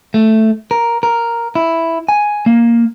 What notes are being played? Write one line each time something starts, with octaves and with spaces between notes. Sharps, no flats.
A3
A#4
A#4
E4
G#5
A#3